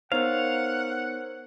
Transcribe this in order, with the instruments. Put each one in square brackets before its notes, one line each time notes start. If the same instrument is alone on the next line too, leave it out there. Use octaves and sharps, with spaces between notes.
[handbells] B3 D#4 C#5 [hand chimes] A#4 C5 [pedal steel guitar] F5 [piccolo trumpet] F#5